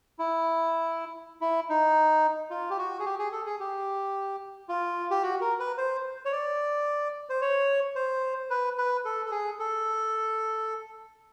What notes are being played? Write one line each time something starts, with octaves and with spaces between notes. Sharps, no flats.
E4
E4
D#4
F4
G4
F#4
G#4
G4
G#4
A4
G#4
G4
F4
G4
F#4
A#4
B4
C5
C#5
D5
C5
C#5
C5
B4
B4
A4
A4
G#4
A4